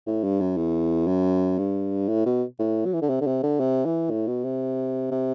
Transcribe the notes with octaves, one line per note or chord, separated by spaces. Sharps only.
A2
G2
F#2
E2
F#2
G2
A2
B2
A2
F#3
E3
D3
C3
D3
C3
D3
C3
E3
A2
B2
C3
C3